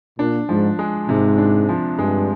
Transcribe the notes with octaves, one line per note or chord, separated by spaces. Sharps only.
A#2 D4
G#2 F3
G#3
G#2 C3
D4
F3
G2 G#3